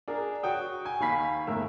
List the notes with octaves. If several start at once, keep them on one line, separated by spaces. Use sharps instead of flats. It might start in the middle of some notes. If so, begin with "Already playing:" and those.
D4 G#4 A#4
F#4 C#5 G5 D#6
G#5
D#2 D#3 F5 G#5 B5 B6
G1 A2 A#4 E5